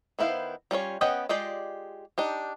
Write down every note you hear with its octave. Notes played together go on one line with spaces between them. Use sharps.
D#3 B3 E4 C5 F5
G3 C#4 F4 C#5
B3 C#4 D#5 F#5 G5
G#3 F4 G4 D5 D#5
D4 D#4 G4